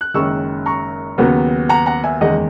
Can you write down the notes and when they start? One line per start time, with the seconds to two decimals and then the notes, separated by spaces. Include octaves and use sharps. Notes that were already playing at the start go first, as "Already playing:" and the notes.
0.01 F#6
0.14 F#1 F#2 D#3 G#3 C#6 E6
0.66 A#5 C#6
1.18 D#2 C#3 F#3 B3
1.69 F#5 A#5
1.86 F#5 A#5
2.04 E5 G#5
2.21 F#1 E2 D#3 G#3 D#5 F#5